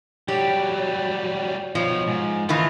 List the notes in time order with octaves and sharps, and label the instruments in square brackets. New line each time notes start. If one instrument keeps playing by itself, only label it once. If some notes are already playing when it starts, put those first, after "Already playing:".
[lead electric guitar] F#3 G3 [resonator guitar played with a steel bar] G4
[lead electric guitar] B2 C#5 [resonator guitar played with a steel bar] F3
[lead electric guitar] G#2
[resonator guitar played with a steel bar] A2 D#3 E3 [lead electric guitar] F4